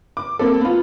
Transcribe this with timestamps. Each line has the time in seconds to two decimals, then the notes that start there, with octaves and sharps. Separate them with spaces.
0.17 D6
0.39 A#3 C4 A4
0.61 B3 F4